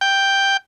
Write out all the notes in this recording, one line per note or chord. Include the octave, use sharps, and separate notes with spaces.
G5